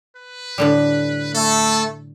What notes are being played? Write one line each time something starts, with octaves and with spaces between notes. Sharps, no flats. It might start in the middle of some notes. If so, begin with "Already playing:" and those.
B4
A2 D3 G3
A3 A4